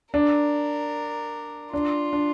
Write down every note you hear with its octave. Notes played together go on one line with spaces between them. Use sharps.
D4 A#4
D4 F4
D4